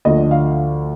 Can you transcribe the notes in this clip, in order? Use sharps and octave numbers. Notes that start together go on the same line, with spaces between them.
D2 D3 F3 D#5
F5